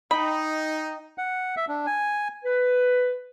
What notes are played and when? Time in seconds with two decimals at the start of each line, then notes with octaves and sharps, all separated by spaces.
0.11 D#4 D#5 G5 B5
1.18 F#5
1.57 E5
1.68 D4
1.86 G#5
2.44 B4